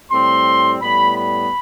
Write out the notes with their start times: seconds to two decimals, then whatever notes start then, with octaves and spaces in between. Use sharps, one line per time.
0.11 A2 G3 C4 C6
0.81 A2 G3 B3 B5
1.16 B5